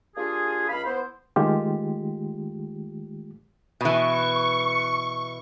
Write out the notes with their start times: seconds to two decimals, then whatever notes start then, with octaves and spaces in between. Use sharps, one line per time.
0.16 A#3 D4 F4 G4 G#4
0.69 C#2 F5 B5
0.86 B3 E4 C5
1.36 D#3 G#3 A3 F4 G4
3.81 B2 E3 C#6